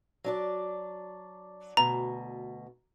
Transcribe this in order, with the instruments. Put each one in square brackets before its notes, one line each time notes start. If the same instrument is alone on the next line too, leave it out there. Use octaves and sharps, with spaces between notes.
[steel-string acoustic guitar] F#3 D4 D5
[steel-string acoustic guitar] D2 B2 [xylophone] A#5